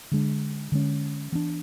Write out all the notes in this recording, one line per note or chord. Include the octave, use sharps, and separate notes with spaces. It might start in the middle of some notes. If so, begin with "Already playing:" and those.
D3 G#3 D4
D3 G#3 C#4
E3 B3 D4